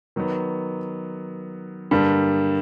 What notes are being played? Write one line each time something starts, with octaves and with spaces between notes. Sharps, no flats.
D#3 F#3 B3
G2 D3 G3 A#3